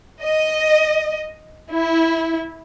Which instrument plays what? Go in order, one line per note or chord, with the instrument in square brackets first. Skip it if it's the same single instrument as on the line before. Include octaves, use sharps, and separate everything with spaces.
[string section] D#5
E4